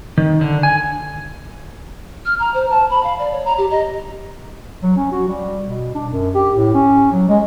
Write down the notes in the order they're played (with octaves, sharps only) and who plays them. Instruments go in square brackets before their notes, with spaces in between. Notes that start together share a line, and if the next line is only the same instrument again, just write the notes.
[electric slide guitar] D#3
D3
G#5
[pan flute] F6
A#5
C5
A5
B5
F5
D5
C#5
A#5
G4
D#5
[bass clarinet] F#3
C#4
F#4
G3
B2
D4
F#2
G4
A2
C#4
F#3
G#3